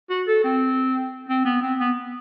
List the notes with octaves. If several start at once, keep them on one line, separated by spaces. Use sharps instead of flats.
F#4
A4
C4
C4
B3
C4
B3